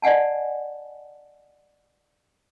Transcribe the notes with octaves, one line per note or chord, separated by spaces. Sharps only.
D5 D#5 F#5 G#5 A5